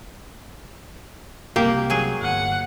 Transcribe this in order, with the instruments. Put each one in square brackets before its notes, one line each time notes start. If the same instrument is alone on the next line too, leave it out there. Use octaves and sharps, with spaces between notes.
[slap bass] C2 F#2 [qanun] A#3 [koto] G4
[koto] F#3 G#4
[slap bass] G1 [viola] F#5